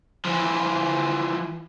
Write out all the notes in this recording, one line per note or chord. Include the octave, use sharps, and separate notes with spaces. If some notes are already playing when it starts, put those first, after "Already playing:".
E3 F3